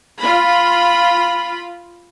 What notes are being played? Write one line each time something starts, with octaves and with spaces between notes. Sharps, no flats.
F4 B5